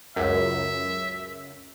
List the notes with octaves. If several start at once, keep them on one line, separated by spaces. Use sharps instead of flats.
C#2 F#2 E5